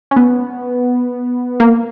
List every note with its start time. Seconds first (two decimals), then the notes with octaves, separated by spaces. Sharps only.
0.11 C#4
0.16 B3
1.60 A#3